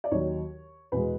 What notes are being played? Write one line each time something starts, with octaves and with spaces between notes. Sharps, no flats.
D5
D#2 D#3 F#3 C#5
E2 B2 G#3 B4